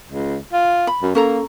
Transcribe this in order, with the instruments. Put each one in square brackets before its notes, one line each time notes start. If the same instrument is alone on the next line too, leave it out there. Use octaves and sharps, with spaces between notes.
[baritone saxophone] C#2
F4
[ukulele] B5
[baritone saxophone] F#2
[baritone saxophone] A#3 [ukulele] C#4 A4 A#5